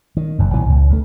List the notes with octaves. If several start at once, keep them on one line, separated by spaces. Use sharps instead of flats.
D#3
F#1 F#2
A#1 B2 D#3 E3
C#2
D2 C#3 A3